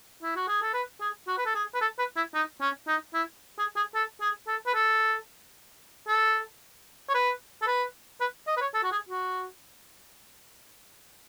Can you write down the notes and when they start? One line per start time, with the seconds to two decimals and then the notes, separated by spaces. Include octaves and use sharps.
0.23 E4
0.36 F#4
0.48 G#4
0.62 A4
0.74 B4
1.01 G#4
1.27 F#4
1.38 B4
1.46 A4
1.55 G#4
1.74 B4
1.81 A4
1.99 B4
2.17 E4
2.34 D#4
2.61 C#4
2.88 D#4
3.14 E4
3.59 G#4
3.76 G#4
3.95 A4
4.21 G#4
4.48 A4
4.67 B4
4.75 A4
6.08 A4
7.09 C#5
7.15 B4
7.62 A4
7.67 B4
8.21 B4
8.47 D#5
8.57 B4
8.61 C#5
8.74 A4
8.83 F#4
8.92 G#4
9.09 F#4